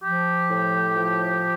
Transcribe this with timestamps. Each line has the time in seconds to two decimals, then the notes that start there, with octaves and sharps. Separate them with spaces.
0.03 F3 G4
0.50 A2
0.96 F3